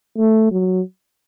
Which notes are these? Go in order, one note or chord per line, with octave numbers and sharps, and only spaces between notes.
A3
F#3